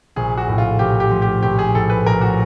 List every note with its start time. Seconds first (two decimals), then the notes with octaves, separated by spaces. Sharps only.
0.16 A#1 G#4
0.38 F#4
0.48 A2
0.58 F4
0.79 A#1 G4
1.00 G4
1.11 F3
1.22 G4
1.42 A#1 G4
1.59 G#4
1.74 A2 A4
1.90 B4
2.06 A#1 A#4
2.21 F#4